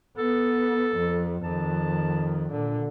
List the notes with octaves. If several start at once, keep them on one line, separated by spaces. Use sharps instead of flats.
B3 A4
F2
F2 D#3 A5
A#2 D3